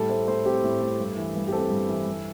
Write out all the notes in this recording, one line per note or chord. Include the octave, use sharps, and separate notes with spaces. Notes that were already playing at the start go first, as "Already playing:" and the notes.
Already playing: A2 G3 A4
A3 C5
A2 C5
C4 G4
A2
A3
G2
E3
G2
G4
C4 A4
G2
E3
G2